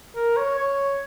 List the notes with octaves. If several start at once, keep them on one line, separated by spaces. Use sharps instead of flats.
A#4
C#5
C#5